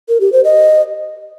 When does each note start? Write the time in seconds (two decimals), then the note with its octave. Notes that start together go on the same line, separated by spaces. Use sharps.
0.09 A#4
0.21 G4
0.33 C5
0.44 D#5